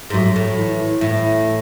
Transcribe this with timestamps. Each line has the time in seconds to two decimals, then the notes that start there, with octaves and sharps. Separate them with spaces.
0.10 G#2
0.14 A2 F#3
0.36 A2
0.58 E3
1.01 A2 E3